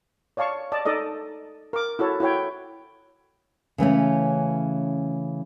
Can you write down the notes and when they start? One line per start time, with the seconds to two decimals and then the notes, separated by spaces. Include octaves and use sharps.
0.37 C#5 D5 F5 A5 C#6
0.72 D5 D#5 A5
0.85 D#4 A4 D5 D#5
1.73 A#4 D6
1.99 E4 F#4 A4 C#5
2.20 E4 F#4 C#5 G5
3.78 C#3 E3 A3 C#4